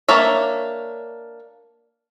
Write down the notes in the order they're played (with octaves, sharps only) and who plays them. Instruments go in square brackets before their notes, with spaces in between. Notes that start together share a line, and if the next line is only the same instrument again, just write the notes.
[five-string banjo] A#3 D4 C#5 E5